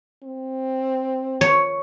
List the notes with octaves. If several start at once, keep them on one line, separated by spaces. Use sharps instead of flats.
C4
C#5